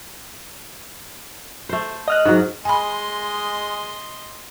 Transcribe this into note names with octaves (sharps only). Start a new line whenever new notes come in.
A3 C5
D#5 F6 F#6
G#2 F#3
G#3 D#5 G#5 B5 C6